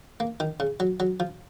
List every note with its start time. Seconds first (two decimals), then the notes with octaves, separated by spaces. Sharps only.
0.20 A#3
0.40 D#3
0.60 C#3
0.80 F#3
1.00 F#3
1.20 F3